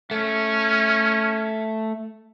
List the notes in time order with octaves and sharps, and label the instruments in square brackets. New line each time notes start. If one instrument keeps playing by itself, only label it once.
[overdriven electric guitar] A3 [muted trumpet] C#4